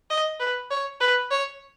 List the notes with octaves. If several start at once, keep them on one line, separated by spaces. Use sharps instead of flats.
D#5
B4
C#5
B4
C#5